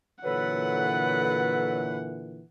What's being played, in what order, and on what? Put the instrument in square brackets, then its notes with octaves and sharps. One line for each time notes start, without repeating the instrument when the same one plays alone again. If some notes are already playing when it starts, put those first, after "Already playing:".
[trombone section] A#2 D3 E3 [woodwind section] F#3 A4 B4 [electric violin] F#5